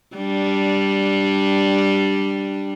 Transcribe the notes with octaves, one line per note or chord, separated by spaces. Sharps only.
G3 D4